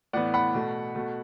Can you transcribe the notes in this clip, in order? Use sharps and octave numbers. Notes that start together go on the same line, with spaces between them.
A2 E3 B3 D5 F#5
F#5 B5
B2 A3
B2 A3